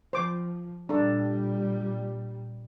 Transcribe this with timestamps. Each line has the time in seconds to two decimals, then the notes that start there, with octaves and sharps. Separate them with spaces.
0.13 F3 C5 D6
0.89 A#2 G3 D4 A4